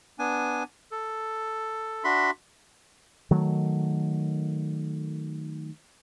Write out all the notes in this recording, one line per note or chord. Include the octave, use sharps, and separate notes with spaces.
B3 D4 G#5
A4
D4 F#4 E5 B5 C6
D#3 F#3 A3